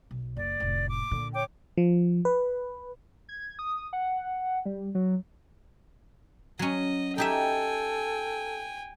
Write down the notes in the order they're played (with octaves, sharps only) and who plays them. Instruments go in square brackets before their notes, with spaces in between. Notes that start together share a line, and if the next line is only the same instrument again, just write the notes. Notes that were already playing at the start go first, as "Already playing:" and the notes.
[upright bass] B1
[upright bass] F#1 D#3 [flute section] D5
[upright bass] F1 A2
[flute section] D6
[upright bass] A#2 D3
[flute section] C#5 G5 D6
[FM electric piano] F3
B4
[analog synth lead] G#6
D#6
F#5
G3
F#3
[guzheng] F#3 C#4 [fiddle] D#5
[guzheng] D#4 G4 E5 [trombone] A4 [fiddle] G5 G#5